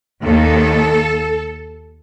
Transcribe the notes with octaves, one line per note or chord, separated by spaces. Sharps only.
D#2 D#3 A4